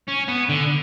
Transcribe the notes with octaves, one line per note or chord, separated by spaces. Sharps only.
C#4
B3
D3